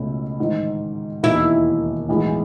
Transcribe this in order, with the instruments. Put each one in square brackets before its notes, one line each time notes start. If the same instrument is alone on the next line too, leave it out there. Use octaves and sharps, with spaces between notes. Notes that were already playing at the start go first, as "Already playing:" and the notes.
Already playing: [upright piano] C#2 B2 A3 C#4 E4
A1 G#2 D#3
[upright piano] E1 D#2 D#3 [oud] E4
[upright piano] B1 A2 E3 G#3